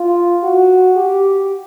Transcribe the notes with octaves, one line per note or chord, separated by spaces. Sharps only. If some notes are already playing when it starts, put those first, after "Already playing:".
Already playing: F4
F#4
G4